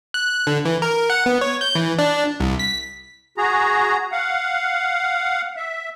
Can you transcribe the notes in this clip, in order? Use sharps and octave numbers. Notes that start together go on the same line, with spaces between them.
F#6
D3
E3
A#4
F#5
B3
C#5
G6
E3
D4
C2
B6
F#4 G#4 A#5
F5 F#5
E5